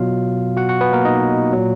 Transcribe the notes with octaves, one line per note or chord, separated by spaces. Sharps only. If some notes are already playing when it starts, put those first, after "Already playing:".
Already playing: B2 F#3 F4 F5
F#4 F#5
F#4 F#5
B3 B4
A#3 A#4
D#4 D#5
A#2 F#3